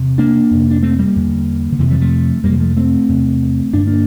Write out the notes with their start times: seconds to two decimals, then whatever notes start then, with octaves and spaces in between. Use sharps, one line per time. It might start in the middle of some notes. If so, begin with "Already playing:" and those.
Already playing: E2 C3
0.18 A#3 D4
0.51 F2 C3
0.71 D4
0.83 A3 C4
0.99 G3 A#3
1.16 E2 D3
1.72 D3
1.79 F2 C3 E3
1.91 E3 G3
2.01 F3 A3
2.44 F2 C3 G3 A#3
2.60 F3 A3
2.77 A3 C4
3.09 E2 C3
3.73 G2 D4
3.76 D3
3.87 A#3 D4